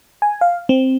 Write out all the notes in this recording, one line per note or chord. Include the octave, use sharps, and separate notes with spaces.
G#5
F5
C4